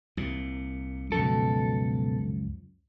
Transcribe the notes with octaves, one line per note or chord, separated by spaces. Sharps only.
C2 A#2
C#2 F#2 B2 F3 A4